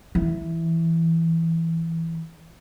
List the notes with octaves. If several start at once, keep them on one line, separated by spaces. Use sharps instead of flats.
E3